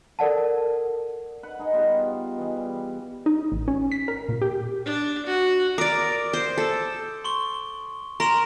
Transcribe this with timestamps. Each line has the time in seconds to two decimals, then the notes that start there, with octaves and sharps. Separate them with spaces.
0.19 A4 A#4 D5 F#5 A5
1.43 B4 F#5
1.59 D#4 G#4 D#5 E5
1.73 G3 B3 F4
2.38 E3 G#4
2.57 G3
3.26 D#4
3.52 A1
3.68 C#4
3.92 B6
4.08 A#4
4.29 A#2
4.42 G4
4.85 D4
5.26 F#4
5.78 A#4 D5 D6 D#6 D7
6.33 C5
6.58 A4
7.24 C6 C#6 G7
8.20 A#4 A#5 C6 E7